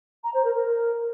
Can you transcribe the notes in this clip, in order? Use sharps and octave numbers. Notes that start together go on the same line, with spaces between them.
A#5
C5
A#4
A#4